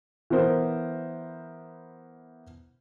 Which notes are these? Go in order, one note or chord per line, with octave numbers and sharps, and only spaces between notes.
E3 B3 A#4 C5